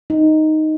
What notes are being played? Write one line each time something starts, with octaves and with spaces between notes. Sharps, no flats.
D#4